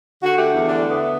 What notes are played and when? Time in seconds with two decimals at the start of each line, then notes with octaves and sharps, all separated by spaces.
0.23 D3 F#4
0.38 A3 G4
0.53 E2
0.68 D3 D4
0.82 A3
0.90 B3